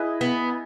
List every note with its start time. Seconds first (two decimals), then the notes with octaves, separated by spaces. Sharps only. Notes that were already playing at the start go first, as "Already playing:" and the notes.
Already playing: E4 G#4 B4 D#5
0.21 B3